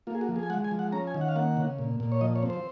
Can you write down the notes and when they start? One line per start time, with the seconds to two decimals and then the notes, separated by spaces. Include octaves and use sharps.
0.07 A#3 F4
0.15 G#4
0.21 F#4
0.29 F3
0.36 G#4
0.43 G#5
0.50 G#3 F#5
0.64 G#5
0.71 F3
0.79 F#5
0.92 C#4 A#5
1.07 G#5
1.14 D#3
1.21 F#5
1.29 F5
1.36 A#3 F#5
1.57 C#3
1.79 A#2
2.00 A#2
2.12 C#5
2.21 F3 D#5
2.36 C#5
2.43 C4
2.50 C5